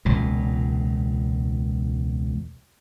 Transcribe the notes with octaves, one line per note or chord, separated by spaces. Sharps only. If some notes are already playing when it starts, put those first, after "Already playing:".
E1 C#2 A#2